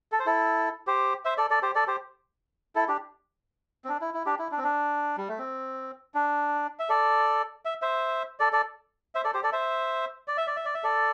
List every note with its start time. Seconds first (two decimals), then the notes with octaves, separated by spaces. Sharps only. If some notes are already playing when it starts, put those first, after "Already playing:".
0.12 A4
0.19 C5
0.26 E4 A4
0.87 G4 C5
1.25 C5 E5
1.38 A4 D5
1.50 A4 D5
1.63 G4 C5
1.75 A4 D5
1.87 G4 C5
2.75 E4 A4
2.88 D4 G4
3.84 C4
3.89 D4
4.01 E4
4.14 E4
4.26 D4 G4
4.39 E4
4.51 D4
4.58 C4
4.64 D4
5.18 G3
5.28 A3
5.39 C4
6.14 D4
6.79 E5
6.89 A4 D5
7.65 E5
7.82 C5 E5
8.40 A4 D5
8.53 A4 D5
9.15 C5 E5
9.24 A4 D5
9.34 G4 C5
9.43 A4 D5
9.52 C5 E5
10.28 D5
10.37 E5
10.47 D5
10.56 E5
10.65 D5
10.75 E5
10.83 A4 D5